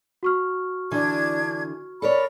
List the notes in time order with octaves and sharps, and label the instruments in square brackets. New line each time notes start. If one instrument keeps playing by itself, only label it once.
[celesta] F#4 C#6 F6
[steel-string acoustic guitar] D3 E3 [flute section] D4 G#6
[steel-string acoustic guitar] A4 A#4 C#5 [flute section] D5 B5